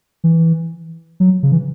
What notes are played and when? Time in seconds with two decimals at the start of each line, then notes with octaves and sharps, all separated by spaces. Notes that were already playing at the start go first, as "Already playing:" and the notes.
0.24 E3
1.20 F#3
1.43 C#3
1.52 E3